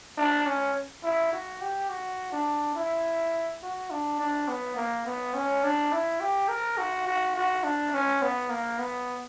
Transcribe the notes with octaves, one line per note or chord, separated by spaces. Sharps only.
D4
C#4
E4
F#4
G4
F#4
D4
E4
F#4
D4
D4
B3
A#3
B3
C#4
D4
E4
G4
A#4
F#4
F#4
F#4
D4
C#4
B3
A#3
B3